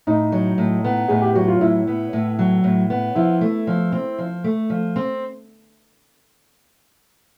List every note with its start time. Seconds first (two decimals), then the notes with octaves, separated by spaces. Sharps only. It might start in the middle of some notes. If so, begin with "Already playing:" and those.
0.07 A2 D#4
0.32 F#3
0.58 A2
0.84 B3
1.08 A2 G#4
1.22 G4
1.35 F#3 F#4
1.48 F4
1.61 A2 E4
1.87 B3
2.13 A2
2.39 F#3
2.64 A2
2.90 B3
3.15 F3 E4
3.41 A3
3.67 F3
3.92 C4
4.18 F3
4.44 A3
4.70 F3
4.96 C4